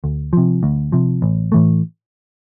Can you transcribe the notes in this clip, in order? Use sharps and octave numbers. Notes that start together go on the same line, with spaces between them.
D2
C3 F3
D2
C3 F3
A1
A2 E3 A3